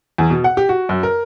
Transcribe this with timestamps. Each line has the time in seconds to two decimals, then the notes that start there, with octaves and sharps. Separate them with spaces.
0.18 E2
0.30 B2
0.44 F#5
0.57 G4
0.69 F#4
0.89 F#2
1.03 A#4